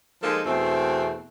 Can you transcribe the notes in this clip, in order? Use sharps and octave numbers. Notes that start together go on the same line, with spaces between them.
F3 G#3 A#3 D#4 F4 A4
E2 B2 A3 C4